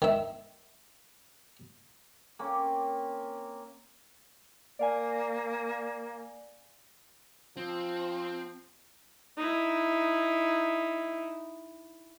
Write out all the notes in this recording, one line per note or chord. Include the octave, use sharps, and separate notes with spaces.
D#3 E5
A#3 C4 C#4
A#3 D5 F5 G#5
F3 C4
D#4 E4